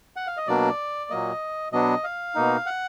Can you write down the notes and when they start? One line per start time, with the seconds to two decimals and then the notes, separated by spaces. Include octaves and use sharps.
0.16 F#5
0.27 F5
0.37 D#5
0.47 B2 F#3 A#3 D4 D5
1.10 A#2 F#3 A#3 D#5
1.72 B2 F#3 B3 D4 D#5
2.04 F5
2.35 B2 A#3 D#4
2.66 F#5